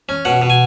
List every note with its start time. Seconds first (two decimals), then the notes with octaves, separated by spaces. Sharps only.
0.09 C#4
0.25 B2 F#5
0.42 B2
0.50 G#5